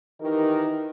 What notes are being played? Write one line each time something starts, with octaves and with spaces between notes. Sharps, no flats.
D#3 E3 D#4 G4 A#4